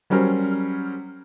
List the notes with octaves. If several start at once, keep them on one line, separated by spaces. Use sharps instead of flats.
F#3 G3 C#4 A#4 C5